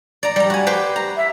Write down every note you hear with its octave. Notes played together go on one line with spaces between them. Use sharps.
D5 A#5
G3 A#5
F#4 G#5
G4 B4 C5
A#5
E5